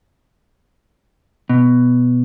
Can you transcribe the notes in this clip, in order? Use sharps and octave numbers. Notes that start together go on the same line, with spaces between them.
B2